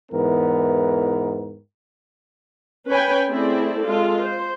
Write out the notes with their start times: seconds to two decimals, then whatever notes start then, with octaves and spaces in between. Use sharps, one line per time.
0.12 E2 G#2 E3 B3 A#4
2.88 C#4 B4 C#5 G5 G#5 B5
3.28 A3 C4 E4 G#4 D5
3.82 G#3 F4 A4
4.24 C5